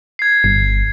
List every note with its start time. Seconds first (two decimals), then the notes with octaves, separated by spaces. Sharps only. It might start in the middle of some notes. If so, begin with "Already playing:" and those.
0.19 G#6 C7
0.44 G1 C7